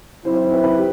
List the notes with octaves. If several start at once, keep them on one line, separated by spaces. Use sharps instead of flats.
F#3 C4 E4 C5
C5
C5
B4
B4
G4